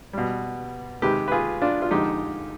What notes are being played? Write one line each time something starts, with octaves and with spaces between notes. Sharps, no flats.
B2 G3
C3 D#3 G#3 G4 B4
B4
F4 G#4
D4 F4
F4
F2 D3 F3 G#3 D#4 G4